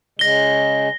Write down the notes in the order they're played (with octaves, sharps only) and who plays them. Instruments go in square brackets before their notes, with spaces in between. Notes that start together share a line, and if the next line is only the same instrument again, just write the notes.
[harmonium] C#3 G#3 [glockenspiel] A#6 G7